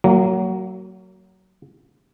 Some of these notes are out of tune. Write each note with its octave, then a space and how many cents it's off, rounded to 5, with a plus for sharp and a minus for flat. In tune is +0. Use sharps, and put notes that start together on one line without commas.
F#3 +20 A#3 -25